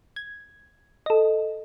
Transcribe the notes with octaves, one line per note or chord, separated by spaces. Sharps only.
G#6
A4 D#5